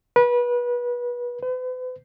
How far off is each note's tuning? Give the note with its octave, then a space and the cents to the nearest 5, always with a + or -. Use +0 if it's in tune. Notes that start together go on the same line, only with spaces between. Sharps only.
B4 -25
B4 +45